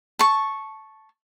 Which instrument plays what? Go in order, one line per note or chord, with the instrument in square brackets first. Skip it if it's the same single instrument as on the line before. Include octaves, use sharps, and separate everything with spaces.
[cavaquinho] A5 C#6